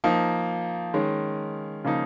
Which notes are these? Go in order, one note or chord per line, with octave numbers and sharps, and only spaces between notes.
F3 A#3 D#4
D#3 G#3 C#4
C#3 F3 A#3 D#4